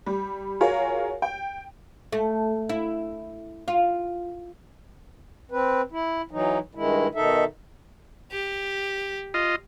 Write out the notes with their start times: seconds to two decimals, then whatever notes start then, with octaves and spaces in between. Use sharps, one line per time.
0.06 G3
0.61 F4 F#4 G#4 A#4 C#5
1.22 G5
2.12 A3
2.69 E4
3.68 F4
5.51 C4 B4
5.92 E4
6.31 E3 F#3 D#4
6.75 G2 D#3 G#3 E4
7.15 B2 D#3 D#4 A4 E5
8.31 G4
9.34 F4 D#5